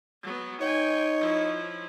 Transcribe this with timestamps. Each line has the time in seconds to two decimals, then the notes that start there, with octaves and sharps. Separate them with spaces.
0.23 F#3 B3
0.61 D#4 C#5 G5 G#5
1.20 F3 E4